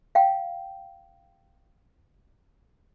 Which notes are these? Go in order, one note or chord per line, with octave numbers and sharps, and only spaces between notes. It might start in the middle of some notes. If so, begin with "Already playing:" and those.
F5 G5